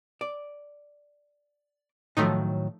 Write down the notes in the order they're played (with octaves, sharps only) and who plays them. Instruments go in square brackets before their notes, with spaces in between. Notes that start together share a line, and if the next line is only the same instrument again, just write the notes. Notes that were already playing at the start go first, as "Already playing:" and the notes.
[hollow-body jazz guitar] D5
[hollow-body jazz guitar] A2 D#3 F#3 [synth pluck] F3 A3 D#4